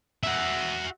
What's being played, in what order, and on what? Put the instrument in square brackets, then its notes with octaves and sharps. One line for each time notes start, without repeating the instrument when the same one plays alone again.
[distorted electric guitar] F#4 E5